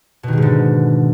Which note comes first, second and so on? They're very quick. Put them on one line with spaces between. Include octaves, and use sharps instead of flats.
B2 D#3 G#3 G#2 D3